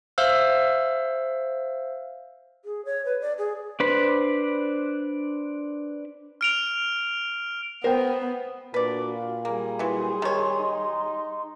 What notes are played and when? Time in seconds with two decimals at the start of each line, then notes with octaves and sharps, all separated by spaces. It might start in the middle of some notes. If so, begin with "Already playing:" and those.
0.18 C5 E5 F5 E6 F6
2.65 G#4
2.85 C#5
3.05 B4
3.21 D5
3.38 G#4
3.80 D4 B4 C5 B5
6.41 F6 D7 F7
7.84 B3 A#4 C5 G5
8.74 A#2 D4 F#4 B4 D5
9.13 F5
9.45 G3 A#3 G#4
9.79 E3 F#3 C6
10.22 D#3 C#5
10.60 D#4